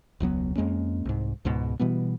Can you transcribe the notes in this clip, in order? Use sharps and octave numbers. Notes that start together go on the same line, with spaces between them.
E1 C#2 F#3 B3
F2 G#3 A#3 C#4
C2 G#2
C#2 G#2 B2
B2 E3 G3 B3